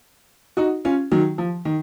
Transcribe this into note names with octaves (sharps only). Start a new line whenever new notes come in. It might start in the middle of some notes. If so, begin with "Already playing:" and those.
D#4 F#4
C#4 F4
D#3 F#3
F3
D#3